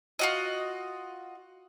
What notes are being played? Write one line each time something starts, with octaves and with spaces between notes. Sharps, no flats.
F4 F#4 D#5